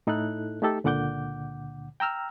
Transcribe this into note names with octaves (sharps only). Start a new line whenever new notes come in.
A2 D#4 E4 A4 F#6
A3 D#4 G4 A4
C#2 A#2 D3 F#5 D6 G6
G5 A#5 E6 F6